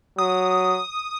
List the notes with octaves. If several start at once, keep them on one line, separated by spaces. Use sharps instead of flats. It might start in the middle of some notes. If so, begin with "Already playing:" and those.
F#3 D#6